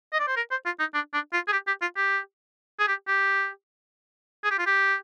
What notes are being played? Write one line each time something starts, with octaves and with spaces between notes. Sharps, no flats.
D#5
D5
C5
A#4
C5
F4
D#4
D4
D4
F4
G#4
G4
G4
F4
G4
G#4
G4
G4
G#4
G4
F4
G4